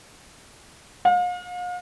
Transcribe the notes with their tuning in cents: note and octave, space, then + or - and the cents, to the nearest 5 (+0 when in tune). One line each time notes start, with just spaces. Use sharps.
F5 +40